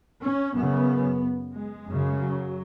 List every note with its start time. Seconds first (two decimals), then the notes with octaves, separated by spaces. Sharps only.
0.22 C#4
0.55 F#2 C#3 B3
1.54 G#3
1.87 F#2 C#3
2.20 F#3